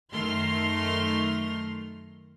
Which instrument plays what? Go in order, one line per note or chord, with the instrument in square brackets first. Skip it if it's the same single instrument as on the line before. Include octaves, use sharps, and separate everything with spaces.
[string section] F#2 D#3 A3 C6 F6